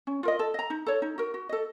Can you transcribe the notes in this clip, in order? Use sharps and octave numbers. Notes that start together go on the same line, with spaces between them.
C#4
F4 A#4 D#5
A4
D#5 A#5
D#4
A4 C#5
D#4
F#4 A#4
F#4
A4 D#5